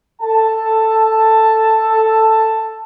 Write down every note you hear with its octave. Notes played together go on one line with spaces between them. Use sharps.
A4 A5